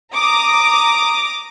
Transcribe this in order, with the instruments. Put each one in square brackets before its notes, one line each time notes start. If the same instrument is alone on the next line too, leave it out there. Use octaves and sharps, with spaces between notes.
[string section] A#5 D6 D#6